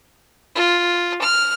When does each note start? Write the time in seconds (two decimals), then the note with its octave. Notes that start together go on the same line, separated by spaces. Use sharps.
0.55 F4
1.22 F6